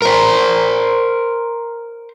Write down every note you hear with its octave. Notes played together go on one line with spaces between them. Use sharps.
A#4 C5